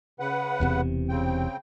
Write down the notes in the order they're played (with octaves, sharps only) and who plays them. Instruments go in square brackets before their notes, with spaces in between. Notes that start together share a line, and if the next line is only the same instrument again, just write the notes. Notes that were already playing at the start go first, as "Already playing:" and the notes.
[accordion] C#3 B4 F#5
[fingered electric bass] E1 E2 C3
[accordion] C#3 C4 G5